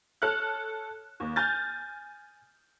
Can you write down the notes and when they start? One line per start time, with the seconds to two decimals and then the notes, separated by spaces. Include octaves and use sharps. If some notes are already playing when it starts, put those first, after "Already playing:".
0.22 A4 C#5 F6 F#6
1.20 D#2
1.36 G#5 F6 G6 A6